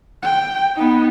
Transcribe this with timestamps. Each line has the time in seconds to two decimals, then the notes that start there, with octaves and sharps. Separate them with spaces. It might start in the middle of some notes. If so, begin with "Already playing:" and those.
0.23 G5
0.75 B3 D#4